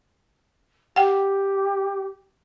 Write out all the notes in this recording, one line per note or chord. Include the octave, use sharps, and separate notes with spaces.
G4 F#5 G5